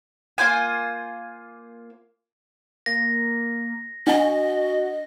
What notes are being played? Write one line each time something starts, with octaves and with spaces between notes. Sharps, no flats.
A#3 F4 C5 G#5
A#3 A#6
D4 F#4 D#5 G#5